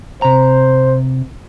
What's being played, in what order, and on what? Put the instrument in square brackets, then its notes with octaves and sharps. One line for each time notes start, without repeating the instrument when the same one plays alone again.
[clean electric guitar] C3 A#5 [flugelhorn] C5